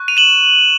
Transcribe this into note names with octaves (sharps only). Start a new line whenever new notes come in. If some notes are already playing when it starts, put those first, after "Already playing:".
Already playing: C#6 F#6
D#7 F7
E7 F#7